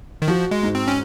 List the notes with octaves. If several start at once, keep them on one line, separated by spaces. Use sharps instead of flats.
D#3
F3 F#4
G#3
G#2
C4
C#4